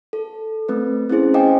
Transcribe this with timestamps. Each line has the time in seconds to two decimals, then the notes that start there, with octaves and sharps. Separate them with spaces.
0.13 A4
0.69 A3 C4 B4
1.09 C4 C#4 E4 G#4 C5
1.34 C5 D#5 F5 G5 G#5 D6